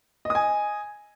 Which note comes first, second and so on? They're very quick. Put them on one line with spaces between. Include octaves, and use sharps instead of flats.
D#5 D#6 G#5